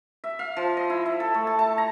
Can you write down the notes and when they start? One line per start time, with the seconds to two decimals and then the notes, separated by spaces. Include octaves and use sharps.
0.24 E5
0.39 F5
0.57 F3
0.77 D#5
0.90 E4
1.06 E5
1.20 A4
1.34 A3
1.47 A5
1.59 A5
1.78 A#5